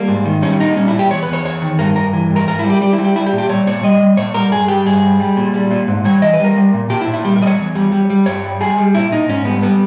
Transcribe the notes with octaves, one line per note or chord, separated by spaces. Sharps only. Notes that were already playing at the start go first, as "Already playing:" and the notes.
Already playing: G3 A#3
G#2
D#3
G3 C#4
A#2 D#4
G3 C#4
E4
A#2
G4
E2 C#5
B4
E2 C#5
E2 C#5
D#3
G2 A#4
G2 A#4
E3
G2
A#4
G#2 A#4
E4
G3
G4
G3 G4
E4
G3
G4
G3 E4
G4
A#2
G4
G3 C#5
A#2 C#5
G3 D#5
G3
A#2 C#5
G3 A#4
G2 G#4
G3 G4
G2 G#4
G3
G3
A#2
G3
A#2
G#2
G3 C#5
E3 D#5
B4
G3 A#4
G3
A#2
A#2 G4
E4
A#2
E4
G3 G4
A#4
G3 D#5
C#5
E2
G3
G3
G3
G2 C#5
G3
G3 G#4
G3
A#2 E4
A#2 D#4
G#2 C#4
G3 B3
G3 B3